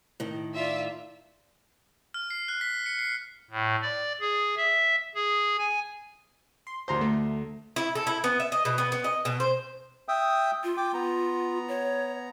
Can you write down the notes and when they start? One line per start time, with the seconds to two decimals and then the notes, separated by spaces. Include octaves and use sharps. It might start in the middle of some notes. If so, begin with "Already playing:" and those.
0.20 A2 D#3
0.54 F4 D5 E5
2.14 F6
2.30 C7
2.48 F#6
2.61 B6
2.86 C#7
2.99 C7
3.51 A2
3.82 D5
4.20 G#4
4.57 E5
5.15 G#4
5.58 G#5
6.67 C6
6.88 D2 C5 A#5 C6
7.01 A3
7.76 E4
7.95 A4
8.07 E4
8.24 B3
8.40 E5
8.52 D#5
8.65 B2
8.78 B3
8.92 B3
9.04 D#5
9.25 B2
9.40 C5
10.08 E5 G5 D#6
10.64 F4
10.77 G5 D6
10.94 B3 A#5
11.68 C#5